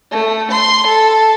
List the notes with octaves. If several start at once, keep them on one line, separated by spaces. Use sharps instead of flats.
A3
C6
A4